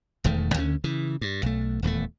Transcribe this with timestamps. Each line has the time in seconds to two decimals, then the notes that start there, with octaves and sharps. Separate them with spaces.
0.24 E1 E2 D#3 A3
0.54 D2 D3 D#3 C#4
0.84 C#3 E3
1.21 G2
1.43 B1 A3
1.82 D#1 E2 D#3 A3